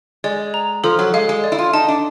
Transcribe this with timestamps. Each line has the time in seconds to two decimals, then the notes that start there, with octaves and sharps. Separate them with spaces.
0.24 G#3 D5
0.54 A#5
0.84 F3 A4
0.99 F#3
1.14 G#3 F5
1.29 G#3
1.44 D5
1.52 E4
1.59 F4
1.73 D#4 A5
1.88 D4